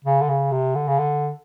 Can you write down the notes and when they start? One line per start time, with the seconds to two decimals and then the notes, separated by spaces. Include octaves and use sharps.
0.05 C#3
0.21 D3
0.29 C#3
0.52 C3
0.75 D3
0.88 C#3
0.98 D3